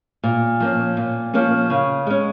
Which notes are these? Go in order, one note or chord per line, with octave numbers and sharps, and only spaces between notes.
A#2
F3 A#3 C#4
A#2
F3 A#3 C#4
C#3
G#3 C#4